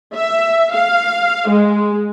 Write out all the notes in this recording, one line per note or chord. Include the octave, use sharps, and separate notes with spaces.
E5
F5
G#3